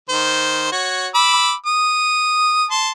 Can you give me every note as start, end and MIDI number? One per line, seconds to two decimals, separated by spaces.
0.09 0.68 51
0.09 0.68 72
0.72 1.07 66
0.72 1.07 73
1.14 1.53 83
1.14 1.53 86
1.14 1.53 88
1.66 2.65 87
2.71 2.90 81
2.71 2.90 84